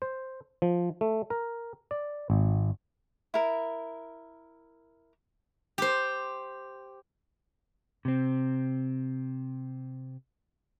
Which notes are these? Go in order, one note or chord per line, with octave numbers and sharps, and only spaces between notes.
C5
F3
A3
A#4
D5
G#1
E4 A#4
G4 C5
C3 C4